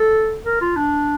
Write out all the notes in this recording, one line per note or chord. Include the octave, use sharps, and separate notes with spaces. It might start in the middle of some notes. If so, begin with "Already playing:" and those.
Already playing: A4
A#4
F4
D4